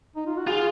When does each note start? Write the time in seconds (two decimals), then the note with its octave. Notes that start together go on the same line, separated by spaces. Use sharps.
0.16 D#4
0.27 F4
0.37 F#4
0.47 F4 G#4